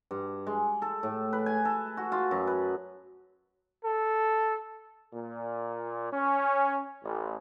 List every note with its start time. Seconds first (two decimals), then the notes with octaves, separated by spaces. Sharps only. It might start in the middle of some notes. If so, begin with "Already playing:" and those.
0.11 G2
0.47 G#3
0.82 A4
1.03 A2
1.33 B4
1.46 G#5
1.65 A4
1.97 F#4
2.12 F4
2.31 F#2
2.47 B4
3.84 A4
5.12 A#2
6.11 C#4
7.03 A1